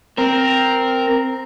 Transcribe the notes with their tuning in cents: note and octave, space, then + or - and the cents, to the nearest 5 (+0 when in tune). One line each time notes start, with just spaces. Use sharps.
C4 +0 A#4 +0